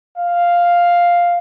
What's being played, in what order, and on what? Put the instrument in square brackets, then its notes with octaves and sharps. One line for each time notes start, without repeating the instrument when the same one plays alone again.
[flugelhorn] F5